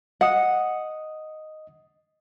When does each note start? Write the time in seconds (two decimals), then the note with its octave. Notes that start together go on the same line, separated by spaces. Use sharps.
0.21 D#5 F#5 D#6